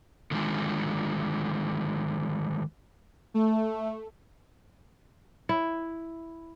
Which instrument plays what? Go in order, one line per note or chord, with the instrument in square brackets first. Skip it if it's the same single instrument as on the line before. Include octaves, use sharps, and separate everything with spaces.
[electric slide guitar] D3 D#3 F3 G#3
[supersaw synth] A3
[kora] E4